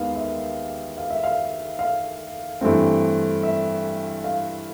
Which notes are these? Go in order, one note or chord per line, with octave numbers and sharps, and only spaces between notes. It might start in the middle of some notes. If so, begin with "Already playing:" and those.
Already playing: D#2 D#3 G#3 B3 F5
E5
F5
E5
F5
F5
G2 E3 A3 C4
E5
F5